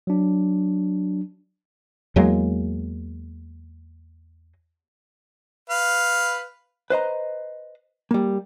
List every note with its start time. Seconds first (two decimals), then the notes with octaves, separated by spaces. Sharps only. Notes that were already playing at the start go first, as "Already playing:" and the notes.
0.07 F#3 D4
2.16 E2 F#3 G#3 A#3
5.69 B4 F5
6.90 B4 C5 D#5 A#5
8.11 G3 A#3